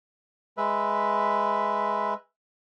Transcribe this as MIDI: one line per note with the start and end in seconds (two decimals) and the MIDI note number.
0.58 2.14 56
0.58 2.14 71
0.58 2.14 76